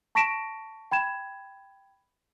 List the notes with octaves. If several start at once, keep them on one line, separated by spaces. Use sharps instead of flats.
A5 C#6 A#6 B6 D7 E7
G5 B5 G#6 E7